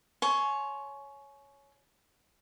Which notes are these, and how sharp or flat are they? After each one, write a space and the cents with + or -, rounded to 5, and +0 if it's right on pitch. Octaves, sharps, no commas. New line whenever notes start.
C#5 +0 G#5 +30 C6 +0